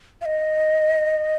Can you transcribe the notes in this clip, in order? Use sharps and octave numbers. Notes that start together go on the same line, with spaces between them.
F5
D#5